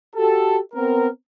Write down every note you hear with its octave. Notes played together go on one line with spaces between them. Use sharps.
F#4 G4 A4
B3 C4 A#4